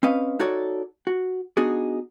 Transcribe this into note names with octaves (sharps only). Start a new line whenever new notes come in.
C4 C#4 B4 D#5 F5
D#4 F#4 A4 C#5 D5
F#4
B3 D4 D#4 F#4 G#4